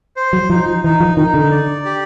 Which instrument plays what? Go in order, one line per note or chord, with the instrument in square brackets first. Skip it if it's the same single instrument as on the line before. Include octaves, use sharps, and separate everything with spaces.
[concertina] C5
[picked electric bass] F#3
[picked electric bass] F3 [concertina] D#4
[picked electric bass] E3 [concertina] D#4
[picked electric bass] F3
[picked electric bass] D#3 [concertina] D#4
[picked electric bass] D3
[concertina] D5
G4